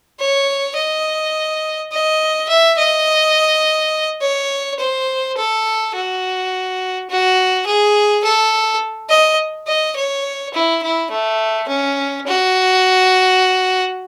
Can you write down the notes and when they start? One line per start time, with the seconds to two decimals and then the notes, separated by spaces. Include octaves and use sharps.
0.20 C#5
0.76 D#5
1.92 D#5
2.49 E5
2.78 D#5
4.21 C#5
4.79 C5
5.37 A4
5.95 F#4
7.10 F#4
7.66 G#4
8.24 A4
9.10 D#5
9.67 D#5
9.96 C#5
10.54 E4
10.83 E4
11.11 A3
11.68 C#4
12.27 F#4